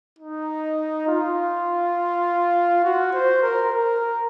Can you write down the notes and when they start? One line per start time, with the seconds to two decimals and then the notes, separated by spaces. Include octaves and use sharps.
0.19 D#4
1.08 F4
2.84 F#4
3.13 C5
3.42 A#4
3.72 A#4